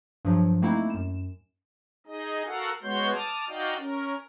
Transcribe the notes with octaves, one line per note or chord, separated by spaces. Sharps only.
G2 F3 F#3
A3 A#3 C4 D#4 E4
F#2 E7
D#4 G#4 D#5
F#4 A4 A#4 F5 F#5
G#3 B3 F#4 C#5 C6 G6
A5 D6 D#6 F6
D#4 F#4 D5 D#5 F5 G5
C#4 A#4